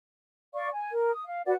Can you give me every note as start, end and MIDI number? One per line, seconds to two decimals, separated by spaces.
0.55 0.68 74
0.55 0.68 77
0.55 0.68 85
0.73 0.92 80
0.93 1.11 70
1.12 1.22 87
1.26 1.42 77
1.46 1.53 66
1.46 1.53 71
1.46 1.53 74
1.46 1.53 78